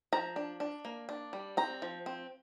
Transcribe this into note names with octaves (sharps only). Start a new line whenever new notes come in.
F3 A#5
D4
D4
A#3
D4
G3
C4 A#5
F3
C4